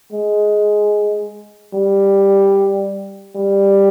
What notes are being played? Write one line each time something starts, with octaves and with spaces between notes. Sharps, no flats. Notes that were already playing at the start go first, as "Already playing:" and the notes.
G#3
G3
G3